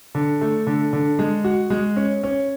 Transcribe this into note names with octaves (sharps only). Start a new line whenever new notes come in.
D3
A3
D3
D3
G#3
F#4
G#3
C#4
C#4